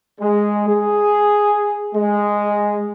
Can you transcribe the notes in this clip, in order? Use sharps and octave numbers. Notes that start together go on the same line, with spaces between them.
G#3
G#4
G#3